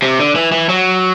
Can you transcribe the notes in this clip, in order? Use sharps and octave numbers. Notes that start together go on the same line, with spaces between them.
C3
D3
E3
E3
F#3